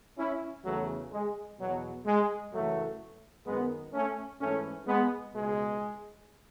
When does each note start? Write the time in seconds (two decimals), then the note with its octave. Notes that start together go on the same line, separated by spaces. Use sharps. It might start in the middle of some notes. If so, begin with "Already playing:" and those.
0.18 C#4 E4
0.64 E2 C#3 E3 F#3 A3
1.12 G#3
1.58 E2 B2 F#3
2.05 G#3
2.53 F#2 C#3 E3 F#3 A3
3.46 F#2 D#3 G#3 B3
3.93 A3 C#4
4.40 G#2 E3 A3 C#4
4.87 G#3 B3
5.34 C#2 B2 G#3